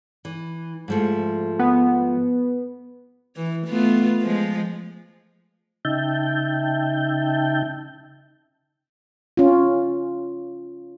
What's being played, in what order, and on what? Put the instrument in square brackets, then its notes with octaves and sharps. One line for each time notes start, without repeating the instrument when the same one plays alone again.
[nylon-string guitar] E3
G#2 F3 A3
[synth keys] B3
[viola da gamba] E3
A3 B3 F4
F3 G#3
[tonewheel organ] C#3 D#4 E5 G5 A5 G6
[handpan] C#4 F4